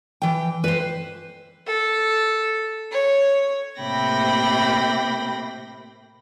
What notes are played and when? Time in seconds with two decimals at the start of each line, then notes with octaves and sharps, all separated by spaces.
0.22 E3 G5
0.64 B4 C5
1.67 A4
2.92 C#5
3.80 A2 C3 A#3 G5 B5 A#6